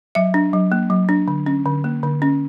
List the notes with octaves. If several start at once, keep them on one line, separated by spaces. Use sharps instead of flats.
F#3 E5
D4
F#3
A#3
F#3
D4
D3
C#4
D3
A#3
D3
C#4